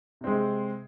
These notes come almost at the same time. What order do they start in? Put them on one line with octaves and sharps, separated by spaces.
C3 C4 G#3